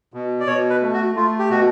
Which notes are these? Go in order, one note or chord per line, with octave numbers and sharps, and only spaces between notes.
B2
D5
B2 C#5
B4
A3
F#4
A3 F4
G4
B2 F#4